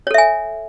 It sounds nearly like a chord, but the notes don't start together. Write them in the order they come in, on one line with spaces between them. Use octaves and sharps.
C#5 A4 E5 G#5